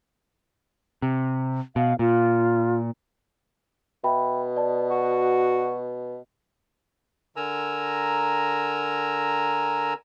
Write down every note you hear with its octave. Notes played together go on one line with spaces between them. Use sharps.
C3
B2 F5
A#2 F4
B2 E5 G5 B5
D5 A5
F#4
D3 A#4 G#5 A#5 E6